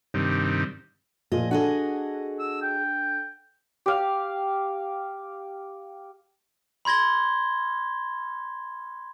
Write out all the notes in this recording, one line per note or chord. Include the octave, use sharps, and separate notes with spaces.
G2 C3 D#3
A#2 F3 G#4 D#5
D4 F#4 G#4 A4 D#5 F#5
E6
G5
G4 F5
B5 C6 G#6 A#6 G7